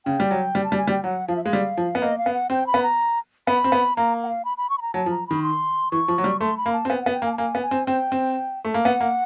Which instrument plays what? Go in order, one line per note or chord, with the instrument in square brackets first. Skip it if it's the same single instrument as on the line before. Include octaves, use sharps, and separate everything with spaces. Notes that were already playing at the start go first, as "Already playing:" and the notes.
[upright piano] C#3 [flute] G5
[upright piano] G3
F#3
G3
[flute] A5
[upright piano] G3
[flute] G#5
[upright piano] G3
[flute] G5
[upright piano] F#3 [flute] F#5
[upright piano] F3 [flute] F5
[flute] E5
[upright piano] G#3 [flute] F5
[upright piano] G3
F3
B3
[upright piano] A#3 [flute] D#5
[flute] F5
[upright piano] B3
[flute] F#5
[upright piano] C4 [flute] G5
[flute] B5
[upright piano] B3
[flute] A#5
[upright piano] B3 [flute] B5
[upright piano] C4
B3
[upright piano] A#3 [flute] A#5
[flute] F#5
F5
B5
B5
C#6
B5
A#5
[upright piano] F#3 [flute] A5
[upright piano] F3
[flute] A#5
[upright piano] D#3 [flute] B5
[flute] C6
[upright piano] E3 [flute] C#6
[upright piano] F3
F#3
G3
[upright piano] A3 [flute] C6
[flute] B5
[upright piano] A#3
[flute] A5
[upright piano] C4
[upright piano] B3 [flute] G#5
[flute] G5
[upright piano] B3 [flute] F#5
[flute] G5
[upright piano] A#3
[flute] G#5
A5
[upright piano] A#3 [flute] G#5
[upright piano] B3
[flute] G#5
[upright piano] C4
[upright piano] C4 [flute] G5
[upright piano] C4
A3
A#3
[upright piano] B3 [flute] F#5
[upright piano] A#3